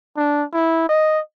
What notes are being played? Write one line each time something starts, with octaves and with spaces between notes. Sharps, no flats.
D4
E4
D#5